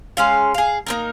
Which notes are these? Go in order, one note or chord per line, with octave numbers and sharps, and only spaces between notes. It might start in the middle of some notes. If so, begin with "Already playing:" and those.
G#3 C#4 F5
G#4 F5
A#3 D#4 A#4